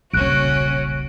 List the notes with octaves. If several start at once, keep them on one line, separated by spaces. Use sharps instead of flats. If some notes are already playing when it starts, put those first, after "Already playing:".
D#1 B1 C#3 C#4 F#4 F#6 D7